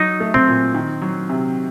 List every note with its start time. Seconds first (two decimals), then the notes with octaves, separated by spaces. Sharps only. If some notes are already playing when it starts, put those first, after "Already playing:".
Already playing: F#3 D#4
0.20 A3
0.34 C4
0.47 A#2
0.74 D#3
1.02 F#3
1.29 C3